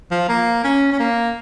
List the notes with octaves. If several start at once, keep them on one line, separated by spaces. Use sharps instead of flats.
F3
A#3
C#4
C#4
A#3